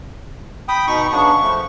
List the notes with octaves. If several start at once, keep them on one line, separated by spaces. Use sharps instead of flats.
G5 B5 D#6
B2 D#4 C#6
C#3 B3 D4 C#6
F3 A3